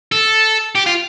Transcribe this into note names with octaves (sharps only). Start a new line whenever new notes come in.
A4
G4
F4